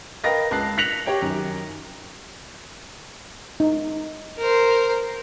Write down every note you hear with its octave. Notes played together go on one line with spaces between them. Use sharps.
A#4 B4 D#5 F5 G5 A#6
C#2 A5 F#6 C7
F#6 A#6 B6 C#7 F7 F#7
G4 C#5 G5
F#2 D#3
D#4
A#4 C5